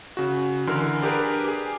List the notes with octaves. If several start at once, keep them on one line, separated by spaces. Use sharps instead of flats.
C#3 F#4
D3 E3 A#4 C6 F6
D4 G4 G#4 A#4 B4
G4 G#4